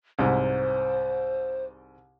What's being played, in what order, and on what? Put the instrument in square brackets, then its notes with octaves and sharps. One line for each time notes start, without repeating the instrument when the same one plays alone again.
[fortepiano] C2 G#2 [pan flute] C5